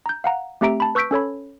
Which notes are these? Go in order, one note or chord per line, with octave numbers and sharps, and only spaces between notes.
A#5 G6
F5 F#5 A#5
A3 C4 G4 E5 A#5 D7
A5 B5
B4 C#6 E6 G6 B6 D7
C#4 A4 C#5 B5